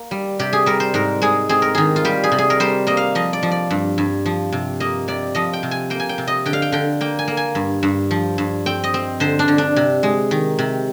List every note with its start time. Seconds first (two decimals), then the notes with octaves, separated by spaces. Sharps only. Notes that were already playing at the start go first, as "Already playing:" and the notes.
Already playing: A#3
0.11 G3
0.39 C3 G4
0.53 G#4
0.66 G3 A#4
0.80 C5
0.94 G#2 A#4
1.22 G#3 G#4
1.49 C4 G#4
1.62 A#4
1.75 D#3 G#4
1.96 F4
2.05 G3 G4
2.24 G#4
2.32 C3
2.38 G#4
2.50 A#4
2.60 G3 C5
2.87 A#3 D#5
2.97 F5
3.15 F3 D#5
3.33 D5
3.43 F3
3.51 D5
3.71 G2
3.98 G2
4.26 F3
4.53 C3
4.80 A#3 D#5
5.08 C3 D5
5.35 F3 D#5
5.53 G5
5.63 C3
5.71 G#5
5.90 A#3 G5
6.00 G#5
6.09 G5
6.18 C3
6.27 D#5
6.46 D3 G5
6.53 F5
6.62 G5
6.72 D3 G5
7.01 A#3 G5
7.19 G#5
7.28 A#3
7.37 G#5
7.55 G2
7.83 G2
8.11 F3
8.38 G2
8.66 C4 G5
8.84 D#5
8.94 C4
9.20 D3 C5
9.39 D4
9.48 D3
9.58 D4
9.76 C3
10.03 G#3
10.31 D#3
10.59 C3